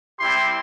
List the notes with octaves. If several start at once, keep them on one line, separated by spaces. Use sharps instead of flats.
G3 C4 E4 G4 C6